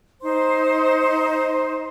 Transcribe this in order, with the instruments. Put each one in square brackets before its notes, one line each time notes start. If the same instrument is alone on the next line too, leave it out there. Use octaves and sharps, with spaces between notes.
[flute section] D#4 C5 C6